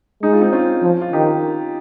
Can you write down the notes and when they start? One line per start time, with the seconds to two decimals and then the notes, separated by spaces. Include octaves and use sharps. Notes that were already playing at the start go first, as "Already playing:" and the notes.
0.22 G#3 D#4
0.32 F4
0.41 C4 D#4
0.52 C#4 F4
0.82 F3
1.01 F4
1.13 D#3 D#4 G4